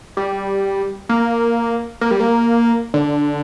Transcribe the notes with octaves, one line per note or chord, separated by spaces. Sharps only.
G3
A#3
A#3
G3
A#3
D3